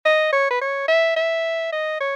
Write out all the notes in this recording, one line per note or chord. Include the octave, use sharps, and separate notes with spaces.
D#5
C#5
B4
C#5
E5
E5
D#5
C#5